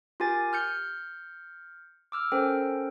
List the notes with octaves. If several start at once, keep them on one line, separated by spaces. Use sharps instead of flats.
F4 G4 A#4 G#5 A6
F6 G6 C#7
D6 E6 F6
C#4 A4 A#4 C5 G5